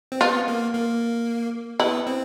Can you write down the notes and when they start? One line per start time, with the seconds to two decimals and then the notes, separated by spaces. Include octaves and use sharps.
0.12 C4
0.21 B3 F4
0.48 A#3
0.74 A#3
1.80 B3 E4
2.07 C4